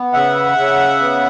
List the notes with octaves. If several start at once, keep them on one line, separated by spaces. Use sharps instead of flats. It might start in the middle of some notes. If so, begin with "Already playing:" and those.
Already playing: B3
C#3 E5 F#5
C#3
B3